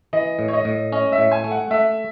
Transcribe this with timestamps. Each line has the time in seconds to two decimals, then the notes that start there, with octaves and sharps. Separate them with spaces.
0.13 E3 D#5
0.39 A2
0.48 C#5
0.53 D#5
0.65 A2
0.92 C#4 D#5
1.12 E5
1.18 A2
1.31 G#5
1.44 A3
1.51 F#5
1.71 A3 E5